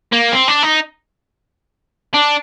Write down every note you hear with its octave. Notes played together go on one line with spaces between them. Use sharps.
A#3
C4
D4
D#4
D4